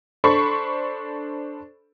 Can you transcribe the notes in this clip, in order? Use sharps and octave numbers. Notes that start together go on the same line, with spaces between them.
D4 A4 C5 B5 C#6